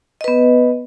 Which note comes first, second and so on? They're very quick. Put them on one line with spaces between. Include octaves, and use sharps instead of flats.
D#5 B4 B3